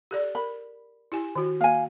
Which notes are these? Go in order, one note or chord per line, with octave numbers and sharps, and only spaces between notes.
G4 A4 D5
A#4 B5
E4 G4 G#5
D#3 F#4
A#3 F5 G#5